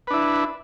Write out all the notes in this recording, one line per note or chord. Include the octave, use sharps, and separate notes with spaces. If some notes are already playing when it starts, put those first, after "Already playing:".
D4 E4 B4